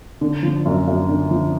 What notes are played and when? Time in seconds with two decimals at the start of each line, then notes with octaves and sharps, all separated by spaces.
0.21 D3
0.43 F3
0.65 F#2
0.87 F#2
1.09 D3
1.31 F3